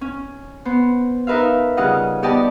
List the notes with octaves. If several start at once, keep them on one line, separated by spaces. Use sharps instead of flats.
C#4
B3 C5
D#4 A#4 B4 E5 F5
C#3 G3 F4 D#5 F#5
B3 G4 D5 D#5 G5 A5